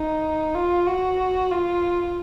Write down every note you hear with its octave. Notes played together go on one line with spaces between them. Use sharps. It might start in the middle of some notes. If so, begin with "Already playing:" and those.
Already playing: D#4
F4
F#4
F4